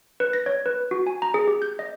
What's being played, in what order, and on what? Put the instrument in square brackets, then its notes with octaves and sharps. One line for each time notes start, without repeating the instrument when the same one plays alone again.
[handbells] B4
A#6
C#5
B4
F#4
G#5
A#5
G#4
G4
G6
D#5